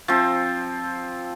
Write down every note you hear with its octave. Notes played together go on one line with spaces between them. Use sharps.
F3 C4